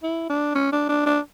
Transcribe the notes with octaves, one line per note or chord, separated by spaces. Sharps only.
E4
D4
C#4
D4
D4
D4